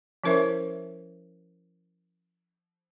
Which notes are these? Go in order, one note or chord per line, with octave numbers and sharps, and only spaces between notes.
F3 C#4 E4 A#4 C5 E5